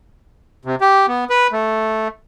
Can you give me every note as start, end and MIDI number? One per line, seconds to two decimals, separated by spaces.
0.65 0.75 48
0.81 1.06 67
1.08 1.24 59
1.30 1.47 71
1.52 2.08 57